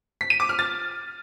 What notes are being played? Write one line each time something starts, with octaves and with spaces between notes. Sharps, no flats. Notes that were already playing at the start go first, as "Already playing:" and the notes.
B6
D#7
D6
F6
A6